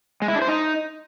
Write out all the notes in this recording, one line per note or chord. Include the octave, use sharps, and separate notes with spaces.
G#3
E4
D4
C5
D#4